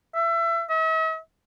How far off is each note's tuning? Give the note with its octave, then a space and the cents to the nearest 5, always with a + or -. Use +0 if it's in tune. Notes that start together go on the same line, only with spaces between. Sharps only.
E5 +25
E5 -45